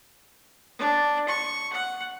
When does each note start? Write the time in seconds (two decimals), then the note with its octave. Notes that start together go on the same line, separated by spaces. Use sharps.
0.79 D4
1.28 C#6
1.73 F#5